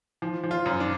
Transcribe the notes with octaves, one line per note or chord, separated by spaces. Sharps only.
F3
F3
F4
F#2
D4